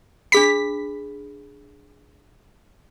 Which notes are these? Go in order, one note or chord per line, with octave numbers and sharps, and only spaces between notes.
D4 G#4 B5 B6